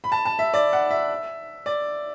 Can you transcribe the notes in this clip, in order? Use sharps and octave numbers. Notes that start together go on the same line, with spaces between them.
B5
A5
A5
E5
D5
F#5
E5
D5